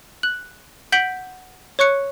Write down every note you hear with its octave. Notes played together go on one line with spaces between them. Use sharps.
F#6 F#7
F#5 G6 B6 D7 F#7 G7
C#5 C#6 F#6 C#7